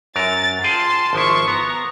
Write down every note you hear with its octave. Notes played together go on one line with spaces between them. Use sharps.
F#2 F#3 A#4 A6
F4 G#4 G5 A5 C6
G#1 F3 E4 C6 C#6
B3 A#5